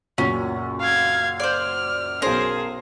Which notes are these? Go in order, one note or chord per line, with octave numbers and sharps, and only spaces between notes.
C#2 F#2 A#2 C#4
F5 G#6
C5 D5 F6
B1 C#4 G#4 A#4 C5